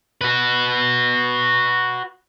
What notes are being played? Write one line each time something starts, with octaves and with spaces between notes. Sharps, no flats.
F#4 B4